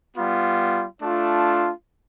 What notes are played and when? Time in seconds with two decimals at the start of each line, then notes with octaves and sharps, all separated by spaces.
0.15 G3 B3 F4
1.01 A3 D4 F4